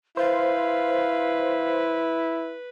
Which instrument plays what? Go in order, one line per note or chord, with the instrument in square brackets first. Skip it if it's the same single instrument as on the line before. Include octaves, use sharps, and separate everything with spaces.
[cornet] E4 [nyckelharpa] B4 [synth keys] C5 [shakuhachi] F5